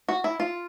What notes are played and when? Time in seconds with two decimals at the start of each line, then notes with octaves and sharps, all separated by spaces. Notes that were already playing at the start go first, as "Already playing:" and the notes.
0.09 F#4
0.24 E4
0.40 F4